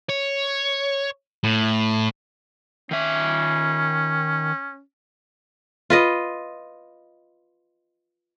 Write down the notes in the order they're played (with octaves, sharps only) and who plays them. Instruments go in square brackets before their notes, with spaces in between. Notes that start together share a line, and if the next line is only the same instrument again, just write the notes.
[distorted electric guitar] C#5
A2
[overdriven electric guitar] D#3 E5 [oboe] C#4
[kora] F4 B4 D#5